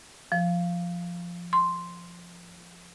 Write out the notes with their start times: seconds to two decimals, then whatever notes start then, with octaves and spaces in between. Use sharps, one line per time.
0.32 F3
1.53 C6